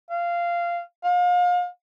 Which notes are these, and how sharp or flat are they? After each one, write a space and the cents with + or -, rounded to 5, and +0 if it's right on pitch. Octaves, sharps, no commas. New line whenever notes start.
F5 -15
F5 +35